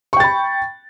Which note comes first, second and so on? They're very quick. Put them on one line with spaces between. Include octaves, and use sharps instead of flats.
C#6 G5 A6 B5